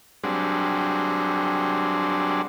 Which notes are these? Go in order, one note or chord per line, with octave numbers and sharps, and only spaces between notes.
F#3 G3 C4 D4 G#4